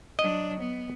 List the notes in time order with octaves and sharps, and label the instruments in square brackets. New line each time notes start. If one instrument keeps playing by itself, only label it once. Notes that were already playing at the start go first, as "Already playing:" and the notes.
[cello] F#3 D4 [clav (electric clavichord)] D#5
[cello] B3